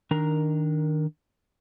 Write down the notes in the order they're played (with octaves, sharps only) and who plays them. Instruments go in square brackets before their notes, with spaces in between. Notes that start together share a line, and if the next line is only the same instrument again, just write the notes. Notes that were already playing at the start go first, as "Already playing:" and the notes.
[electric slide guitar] D#3 D4 A#4 A#5